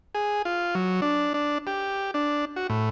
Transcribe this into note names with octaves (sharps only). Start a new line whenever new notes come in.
G#4
F4
F#3
D4
D4
G4
D4
F#4
A2